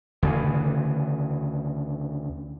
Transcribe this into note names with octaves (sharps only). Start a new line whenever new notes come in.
D2 C#3 E3